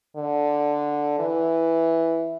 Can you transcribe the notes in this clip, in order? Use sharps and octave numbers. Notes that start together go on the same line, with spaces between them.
D3
E3